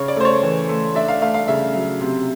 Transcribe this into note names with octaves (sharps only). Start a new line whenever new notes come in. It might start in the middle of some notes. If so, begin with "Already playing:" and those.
Already playing: C#3 C#5
D5
A3 C5
C#5
E3
A3
D4 E5
F5
A3 F5
F5
C#3 E5
F#3
C3